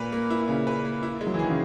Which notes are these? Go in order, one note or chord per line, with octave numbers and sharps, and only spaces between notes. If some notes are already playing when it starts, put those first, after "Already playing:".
Already playing: A#2 A#3 B4
A#3
E4
A#2 C#3
B4
A#3
E4
G#3
F#3
E3
D#3 G#4
C#3